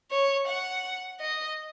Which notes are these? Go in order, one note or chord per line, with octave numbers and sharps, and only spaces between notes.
C#5
F#5
D#5